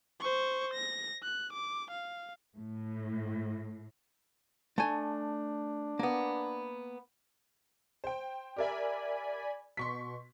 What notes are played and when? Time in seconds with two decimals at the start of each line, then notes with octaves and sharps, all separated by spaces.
0.20 C5 C#6
0.74 A#6
1.23 F#6
1.53 D6
1.91 F5
2.56 A2
4.78 A3 D4 G#5
5.99 A#3 B3
8.04 C5 G5
8.56 G4 A#4 D5 E5 G#5 B5
9.77 B2 C6 C#6 B6